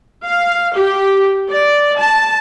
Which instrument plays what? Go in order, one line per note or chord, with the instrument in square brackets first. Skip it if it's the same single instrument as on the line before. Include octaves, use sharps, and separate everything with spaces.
[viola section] F5
G4
D5
A5